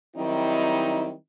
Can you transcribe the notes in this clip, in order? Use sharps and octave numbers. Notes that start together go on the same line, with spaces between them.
D#3 F#3 G3 C4 D#4 E4